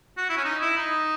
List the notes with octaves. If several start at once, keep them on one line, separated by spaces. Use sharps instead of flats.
F#4
E4
C#4
D#4
E4
D#4